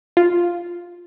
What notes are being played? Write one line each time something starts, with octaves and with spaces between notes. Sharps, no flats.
F4